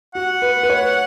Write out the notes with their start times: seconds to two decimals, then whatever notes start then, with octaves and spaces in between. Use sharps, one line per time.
0.15 F#4 F#5
0.42 B4
0.63 B4
0.70 C#5